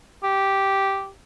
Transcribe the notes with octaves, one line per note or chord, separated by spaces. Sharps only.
G4